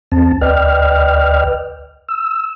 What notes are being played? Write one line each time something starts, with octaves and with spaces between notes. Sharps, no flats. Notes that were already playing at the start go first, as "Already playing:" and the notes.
E2 C4 A5
D2 B4 D5 D#5 G5 F6
E6